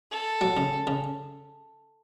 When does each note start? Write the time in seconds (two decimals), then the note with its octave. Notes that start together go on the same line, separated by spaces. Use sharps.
0.11 A4
0.41 F#3
0.57 C#3
0.87 C#3